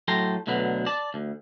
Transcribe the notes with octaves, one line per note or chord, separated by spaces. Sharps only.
A2 F#3 A4 G5 A#5 C6
D2 B2 D3 F#3 B4
D5 A5
D2